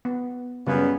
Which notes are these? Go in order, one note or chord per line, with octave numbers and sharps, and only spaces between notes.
B3
F#2 C#3 G3 B3 C#4